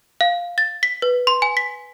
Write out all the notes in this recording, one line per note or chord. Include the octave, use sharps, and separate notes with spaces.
F5
A6
B6
B4
C6
G#5
B6